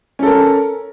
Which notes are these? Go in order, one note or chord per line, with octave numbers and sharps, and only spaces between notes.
C#4 A4 A#4